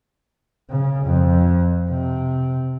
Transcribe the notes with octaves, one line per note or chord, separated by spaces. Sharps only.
C#3
F2
C3